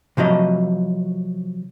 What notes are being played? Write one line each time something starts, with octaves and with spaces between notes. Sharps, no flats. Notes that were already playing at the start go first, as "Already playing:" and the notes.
C3 F3 F#3 D#5